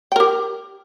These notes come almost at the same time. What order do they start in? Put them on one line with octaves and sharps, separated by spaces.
G5 A#4 G4